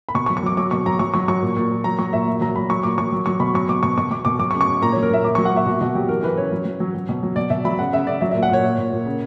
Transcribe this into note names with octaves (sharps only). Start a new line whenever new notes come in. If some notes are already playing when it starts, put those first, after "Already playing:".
B5
B2 C#6
C#6
F#3
C#6
F#3 D6
F#3 D6
B2 C#6
F#3 A#5
F#3 C#6
F#3 C#6
F#3 C#6
A#2
A#2
A#2
F#3 A#5
F#3 C#6
A#2 E5
F#3
F#3 A#5
F#3 B5
F#3 C#6
A#2 D6
F#3 C#6
F#3
F#3 C#6
B2 B5
F#3 C#6
B2 D6
B2 C#6
B2 C#6
B2 D6
B2 D6
F#3 D6
C#6
C#3
C#6
C#3
A#2 A#5
F#3 C#5
A#4
A#2 E5
A#2 D6
F#3 C#6
F#5
A#2 E5
B2 F#4
B2 F#4
F#3 G4
E3 A#4
E3 B4
C#3 C#5
F#3
F#3
F#3
F#3
B2
F#3
B2 D5
B2 E5
F#3 B5
C#3 F#5
C#3 E5
C#3 D5
F#3 E5
A#2 E5
F#5
A#2 C#5
A#2
A#2
A#2
C#3